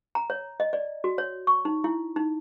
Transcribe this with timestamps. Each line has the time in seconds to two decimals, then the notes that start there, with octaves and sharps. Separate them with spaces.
0.15 A#5
0.30 C#5
0.60 D#5
0.73 D5
1.04 F#4
1.18 C#5
1.47 C#6
1.65 D#4
1.84 E4
2.16 D#4